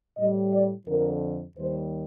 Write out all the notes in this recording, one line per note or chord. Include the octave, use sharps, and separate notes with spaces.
A2 G3 D#5
D5
F2 D3 F3 A#4
D#2 D#3 G3 C5